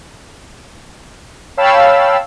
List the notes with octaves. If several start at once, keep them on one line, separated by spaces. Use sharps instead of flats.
C#5 F5 G5 A5 B5 E6